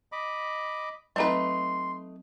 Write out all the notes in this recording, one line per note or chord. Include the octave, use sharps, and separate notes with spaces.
D#5 B5 D6
F#3 A3 C4 D#4 B4 C6